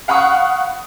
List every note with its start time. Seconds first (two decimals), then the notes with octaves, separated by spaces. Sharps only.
0.08 F5 F#5 B5 C#6 D#6